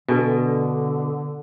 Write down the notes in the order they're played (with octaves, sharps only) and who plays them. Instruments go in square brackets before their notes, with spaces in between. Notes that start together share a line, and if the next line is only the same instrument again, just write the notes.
[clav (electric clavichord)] B2 [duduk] D3 [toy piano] D4 A4 B4